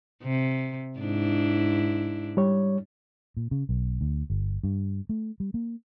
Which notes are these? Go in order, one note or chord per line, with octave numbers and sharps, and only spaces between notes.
C3
G#2 D4 E4
G3 C#5
A#2
C#3
B1
D2
G1
G2
A3
G3
A#3